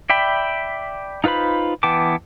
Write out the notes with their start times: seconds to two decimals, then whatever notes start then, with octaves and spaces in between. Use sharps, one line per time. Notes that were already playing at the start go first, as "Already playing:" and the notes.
0.10 D5 E5 G5 B5
1.24 D#4 F4 B4 C5 B5
1.83 E3 B3 G5 A5 D6